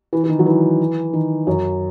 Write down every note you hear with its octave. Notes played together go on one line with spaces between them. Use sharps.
E3
E3
D#3
F#3
E3
D#3
F#2